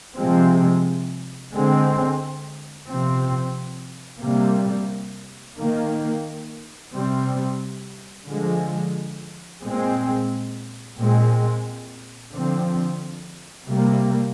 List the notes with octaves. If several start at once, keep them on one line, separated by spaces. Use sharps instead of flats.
C3 F3 G#3 C4
D3 G#3 C4
C3 F3 C4
C3 G3 A#3
D#3 A#3
C3 G3 C4
D3 F3 G#3
A#2 G#3 C4
A#2 G#3 C4
D3 F3 C4
C3 G3 A#3